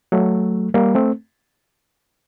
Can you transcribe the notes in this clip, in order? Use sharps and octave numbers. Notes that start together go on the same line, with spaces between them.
F#3 A3
G3 A#3
A3 C4